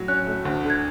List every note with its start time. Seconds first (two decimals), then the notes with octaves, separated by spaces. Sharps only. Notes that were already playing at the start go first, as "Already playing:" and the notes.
Already playing: A2 F#3
0.08 C#4 F#6
0.27 A3
0.45 D2
0.63 D3
0.70 G#6